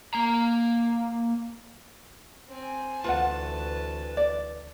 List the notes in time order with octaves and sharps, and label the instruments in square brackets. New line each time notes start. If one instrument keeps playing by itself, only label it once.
[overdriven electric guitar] A#3 A#5
[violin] C4 G#5
[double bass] D2 E3 [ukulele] F4 F#5 [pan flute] B4 [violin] A5
[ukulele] D5